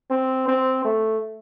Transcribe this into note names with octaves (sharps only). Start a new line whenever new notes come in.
C4
C4
A3